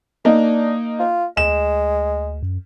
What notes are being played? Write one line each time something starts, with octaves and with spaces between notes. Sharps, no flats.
A#3 D4 D#4
F4
D2 G#3 E7
F#2